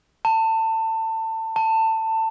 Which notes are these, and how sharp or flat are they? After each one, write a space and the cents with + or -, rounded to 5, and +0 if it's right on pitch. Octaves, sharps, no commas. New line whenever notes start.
A5 +25
A5 +20